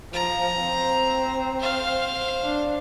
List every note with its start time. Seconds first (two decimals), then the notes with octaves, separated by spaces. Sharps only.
0.13 F3 A#5
0.60 C4
1.60 C5 F5
2.44 D4